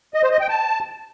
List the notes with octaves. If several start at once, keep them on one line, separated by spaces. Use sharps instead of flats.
D#5
C5
D#5
G5
A5